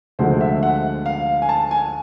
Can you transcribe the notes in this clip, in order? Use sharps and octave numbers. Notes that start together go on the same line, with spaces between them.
D2 D3 F3 G#3 C5
E5
F#5
F5
G#5
A5
G#5